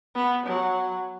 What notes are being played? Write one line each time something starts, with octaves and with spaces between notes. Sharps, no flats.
B3
F#3